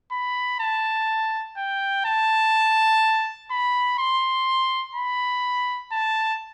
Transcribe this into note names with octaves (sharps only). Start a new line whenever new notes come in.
B5
A5
G5
A5
B5
C6
B5
A5